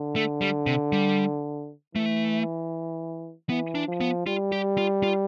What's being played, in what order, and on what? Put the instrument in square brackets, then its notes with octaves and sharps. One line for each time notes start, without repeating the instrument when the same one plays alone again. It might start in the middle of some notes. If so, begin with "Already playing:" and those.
Already playing: [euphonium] D3
[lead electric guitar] A3
G3
C3
G3
[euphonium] E3 [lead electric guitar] A3
[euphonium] E3 [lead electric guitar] B3
[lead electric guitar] D4
[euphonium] F3
[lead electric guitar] B3
[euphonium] G3 [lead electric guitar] F4
[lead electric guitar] G4
F4
F4